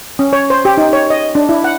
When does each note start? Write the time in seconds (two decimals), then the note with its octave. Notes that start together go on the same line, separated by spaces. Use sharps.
0.19 C#4
0.33 C#5
0.50 C5
0.65 G4
0.78 D#4
0.93 C#5
1.10 D#5
1.35 D4
1.49 E4
1.64 F#5